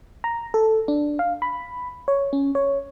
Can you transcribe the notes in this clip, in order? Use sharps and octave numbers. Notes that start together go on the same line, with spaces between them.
A#5
A4
D4
F5
B5
C#5
C#4
C#5